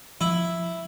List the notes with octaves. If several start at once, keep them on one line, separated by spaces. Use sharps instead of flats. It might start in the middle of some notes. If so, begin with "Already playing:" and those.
F3 E4